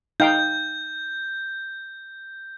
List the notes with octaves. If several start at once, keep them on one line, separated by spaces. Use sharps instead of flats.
D#4 F5 G5 G6